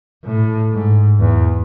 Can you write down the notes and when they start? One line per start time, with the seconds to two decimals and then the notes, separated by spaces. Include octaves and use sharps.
0.25 A2
0.72 G#2
1.20 E2